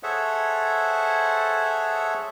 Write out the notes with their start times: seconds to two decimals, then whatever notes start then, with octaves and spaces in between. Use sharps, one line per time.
0.03 G#4 A4 C5 C#5 E5 F#5